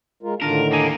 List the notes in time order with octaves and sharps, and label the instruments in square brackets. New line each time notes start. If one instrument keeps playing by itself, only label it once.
[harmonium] G#3 F4 A#4
[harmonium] A2 D3 D#3 [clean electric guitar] D4 F4 [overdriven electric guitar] A#4
[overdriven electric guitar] D#2 A#3 [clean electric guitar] D4 D#4 G#5